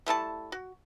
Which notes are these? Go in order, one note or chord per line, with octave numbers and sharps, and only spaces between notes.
G3 A3 E4 A5
F#4